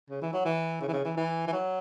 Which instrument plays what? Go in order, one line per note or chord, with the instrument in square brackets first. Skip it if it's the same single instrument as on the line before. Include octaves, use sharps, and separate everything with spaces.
[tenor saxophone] C#3
E3
F#3
E3
C#3
E3
C#3
E3
E3
E3
F#3